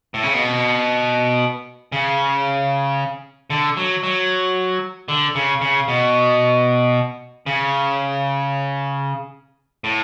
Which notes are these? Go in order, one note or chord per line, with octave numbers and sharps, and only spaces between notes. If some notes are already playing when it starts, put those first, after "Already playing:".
A2
C#3
B2
C#3
D3
F#3
F#3
D3
C#3
C#3
B2
C#3
A2